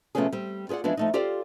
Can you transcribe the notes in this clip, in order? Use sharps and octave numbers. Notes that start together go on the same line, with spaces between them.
C3 F3 A3 B3 C#4 G#4
G3 C4
F4 G#4 B4 D5 F#5
E3 F3 G#3 B3 D4
F3 A3 D#4
F4 G4 A4 C5 D5 F5